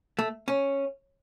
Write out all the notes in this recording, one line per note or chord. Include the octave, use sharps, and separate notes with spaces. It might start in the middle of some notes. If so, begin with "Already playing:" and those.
A3
C#4